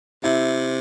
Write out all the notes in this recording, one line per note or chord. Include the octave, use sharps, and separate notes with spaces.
C3 E4